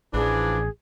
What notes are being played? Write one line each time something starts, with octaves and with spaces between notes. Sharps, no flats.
A1 E3 F3 D4 G#4